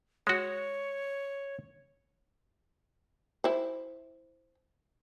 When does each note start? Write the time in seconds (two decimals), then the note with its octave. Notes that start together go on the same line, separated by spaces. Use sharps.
0.27 G#3 F#4 C#5
3.44 E4 C5